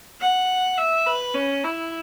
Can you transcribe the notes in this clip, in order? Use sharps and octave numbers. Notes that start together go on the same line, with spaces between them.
F#5
E5
B4
C#4
E4